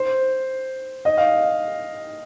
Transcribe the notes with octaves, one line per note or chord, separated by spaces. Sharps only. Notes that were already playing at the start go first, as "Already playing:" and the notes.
Already playing: C5
D#5
F5